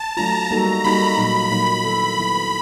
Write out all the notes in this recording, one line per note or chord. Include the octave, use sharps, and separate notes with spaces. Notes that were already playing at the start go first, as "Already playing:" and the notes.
Already playing: A5
F#3 A3 D4 F4 A#5
G3 A#3 D#4 F#4 A4
G3 A#3 D#4 F#4 A4 B5
A#2 F#3 A#3 D#4
A#2 F#3 A#3 D#4 B5
D#3 F#3 B3 E4 A4
D#3 F#3 B3 E4 A4